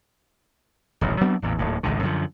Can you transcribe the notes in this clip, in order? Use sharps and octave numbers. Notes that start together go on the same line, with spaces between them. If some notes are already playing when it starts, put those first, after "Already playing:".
D#1 A1 F#2
F#3 B3 C4 D4
A1 E2 A#2
D1 D#2 A2
G#1 C#2 A2 D3
F#2 D3 F3